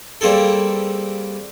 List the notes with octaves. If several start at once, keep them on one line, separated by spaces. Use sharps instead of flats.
G3 A#3 C4 G#4 A4